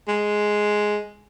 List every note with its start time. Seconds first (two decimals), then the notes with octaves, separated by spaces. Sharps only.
0.08 G#3